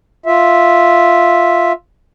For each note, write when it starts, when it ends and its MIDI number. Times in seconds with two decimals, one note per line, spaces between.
0.26 1.72 65
0.26 1.72 76